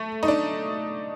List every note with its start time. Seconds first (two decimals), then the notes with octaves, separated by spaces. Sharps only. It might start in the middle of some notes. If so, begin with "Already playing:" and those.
Already playing: A3
0.23 D#4
0.28 D4